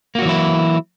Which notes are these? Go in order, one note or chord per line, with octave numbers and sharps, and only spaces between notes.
E3 F#3 A#3 E4 F#4